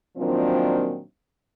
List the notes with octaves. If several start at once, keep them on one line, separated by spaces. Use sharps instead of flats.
A#2 D#3 F3 F#3 C4 D4